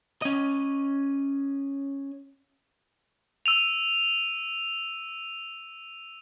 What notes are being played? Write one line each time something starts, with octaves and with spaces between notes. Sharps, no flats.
C#4 D#5
E6 D#7 F7